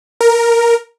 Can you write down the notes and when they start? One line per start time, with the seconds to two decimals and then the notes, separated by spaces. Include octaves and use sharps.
0.21 A#4